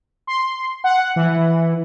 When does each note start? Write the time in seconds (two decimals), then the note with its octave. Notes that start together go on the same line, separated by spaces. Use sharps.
0.27 C6
0.84 F#5
1.16 E3